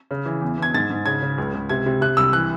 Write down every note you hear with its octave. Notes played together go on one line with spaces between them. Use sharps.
C#3
E3
E2
E2 G#6
G#2 A6
G#2
C#3 G#6
C#3
C#2
C#2
C3 G#6
C3
C3 F#6
C2 E6
E3 F#6